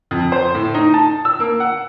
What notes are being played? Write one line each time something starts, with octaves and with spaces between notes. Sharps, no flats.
F2
C5
A2
D#4
A5
E6
A#3
F#5